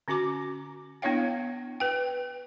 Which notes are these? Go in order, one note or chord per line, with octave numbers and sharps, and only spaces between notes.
D3 C#4 F#4 A#5 D6
B3 D4 E4 C#5 F5 G5
B4 G5